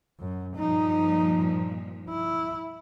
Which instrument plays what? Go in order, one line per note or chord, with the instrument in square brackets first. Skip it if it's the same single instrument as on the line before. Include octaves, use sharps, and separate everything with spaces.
[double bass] F#2
[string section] G2 A#2 F3 [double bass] D#4
[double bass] E4